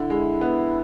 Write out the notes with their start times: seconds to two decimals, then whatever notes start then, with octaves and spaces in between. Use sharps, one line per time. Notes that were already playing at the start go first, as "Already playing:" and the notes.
Already playing: D3 E4
0.10 G#3
0.41 B3